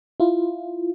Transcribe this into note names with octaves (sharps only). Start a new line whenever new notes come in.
E4 F4